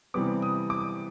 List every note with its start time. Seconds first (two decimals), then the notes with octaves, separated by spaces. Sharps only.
0.14 C3 E3 G3 B3 D6
0.42 D#6
0.70 D6